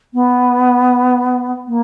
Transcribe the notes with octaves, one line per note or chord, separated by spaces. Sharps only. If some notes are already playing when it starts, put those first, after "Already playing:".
B3
A#3